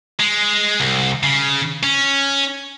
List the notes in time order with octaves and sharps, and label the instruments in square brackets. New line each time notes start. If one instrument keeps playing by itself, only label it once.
[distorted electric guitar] G#3
C2
C#3
C#4